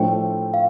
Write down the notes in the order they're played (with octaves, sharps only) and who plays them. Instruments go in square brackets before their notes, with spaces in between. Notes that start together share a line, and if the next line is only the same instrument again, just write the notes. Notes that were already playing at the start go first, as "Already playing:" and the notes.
Already playing: [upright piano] A2 F3 A3 D4 [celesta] G5
[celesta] F5